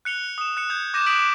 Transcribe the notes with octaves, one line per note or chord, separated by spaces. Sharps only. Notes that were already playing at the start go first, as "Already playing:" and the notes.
F#6 C#7 F7 G7
D#6 E7
F#6 C#7
D#6 G6 G#6
D6 G6 A#6 D#7 E7
D6 D#6 F#6 B6 D7 F#7